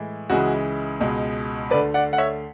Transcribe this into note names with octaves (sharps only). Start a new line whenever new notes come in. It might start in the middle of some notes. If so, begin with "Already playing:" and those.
Already playing: A2 E3 G#3
C#2 C#3 E3 G#3 F#4
C#2 B2 G#3
D2 D3 A3 B4 D5
D5 F#5
F#5
C#5 E5